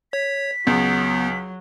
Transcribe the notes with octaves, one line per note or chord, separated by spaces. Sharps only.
C#5 B6
C#2 F#3 B3